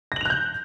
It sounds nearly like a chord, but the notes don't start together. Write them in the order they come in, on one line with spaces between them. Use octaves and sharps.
A#6 F#7 F7 F#6 G6